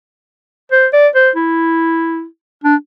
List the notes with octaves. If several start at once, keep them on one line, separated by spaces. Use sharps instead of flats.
C5
D5
C5
E4
D4